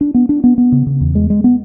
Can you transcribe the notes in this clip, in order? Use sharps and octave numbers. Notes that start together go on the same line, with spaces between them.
D4
B3
D4
B3
B3
C#3
C#3
E2
G#3
G#3
B3